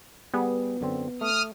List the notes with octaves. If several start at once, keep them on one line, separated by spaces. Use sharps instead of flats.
G3 B3 G#4
F#2 D3 C4
A3 D#6 F6